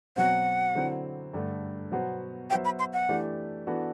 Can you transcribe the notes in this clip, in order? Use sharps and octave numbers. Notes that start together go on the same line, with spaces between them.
B2 F#3 C4 F#5
D3 F#3 C4 E4
G2 D3 A3
B2 F#3 B3 F#4 C5
F#3 B3 F#4 C5 E5 G5
B5
C6
F#5
E3 A3 D4 G4
E3 B3 D4 F#4 A4